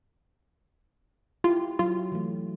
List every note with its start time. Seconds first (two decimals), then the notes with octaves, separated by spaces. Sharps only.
1.44 E4 F4 G4
1.79 F#3 F4
2.12 E3 A3